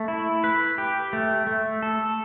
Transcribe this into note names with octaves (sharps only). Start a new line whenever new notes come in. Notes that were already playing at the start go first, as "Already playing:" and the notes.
Already playing: A3
E4
B4
G4
A3
A3
A4